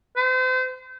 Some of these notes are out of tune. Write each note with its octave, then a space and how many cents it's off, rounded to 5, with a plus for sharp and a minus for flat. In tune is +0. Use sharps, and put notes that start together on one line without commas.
C5 -35